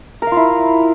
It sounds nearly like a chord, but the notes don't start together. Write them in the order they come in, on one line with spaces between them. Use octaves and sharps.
A#4 F5 F4 E4